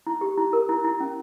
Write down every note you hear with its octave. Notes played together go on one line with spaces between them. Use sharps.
E4
G4
E4
A#4
E4
E4
C#4